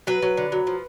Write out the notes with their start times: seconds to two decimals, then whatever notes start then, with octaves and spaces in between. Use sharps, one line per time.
0.07 F#3 B4
0.22 F#3
0.37 D3
0.52 F#3
0.67 F3